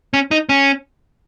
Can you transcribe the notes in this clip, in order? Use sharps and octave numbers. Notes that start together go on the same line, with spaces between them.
C#4
D#4
C#4